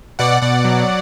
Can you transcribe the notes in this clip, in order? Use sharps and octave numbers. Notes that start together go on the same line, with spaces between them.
B2 D5 F#5
B2 D5 F#5
F#3